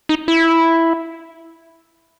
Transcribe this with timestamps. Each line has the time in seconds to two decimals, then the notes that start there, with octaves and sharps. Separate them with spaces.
0.09 D#4
0.28 E4